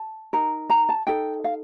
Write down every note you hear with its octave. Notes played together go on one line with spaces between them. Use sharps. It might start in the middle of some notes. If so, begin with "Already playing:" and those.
Already playing: A5
D#4 A#4
A#5
A5
D#4 A4 G5
F5